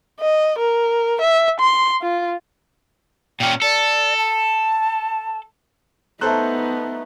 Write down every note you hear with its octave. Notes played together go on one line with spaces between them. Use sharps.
D#5
A#4
E5
C6
F4
A#2 C#4 G5
A4 D5
A5
A3 B3 D#4 A4 C5 A#5 F#6